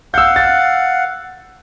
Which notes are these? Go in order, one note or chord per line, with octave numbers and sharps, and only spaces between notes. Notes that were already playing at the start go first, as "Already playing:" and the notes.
F5 F#5 E6 G6
A6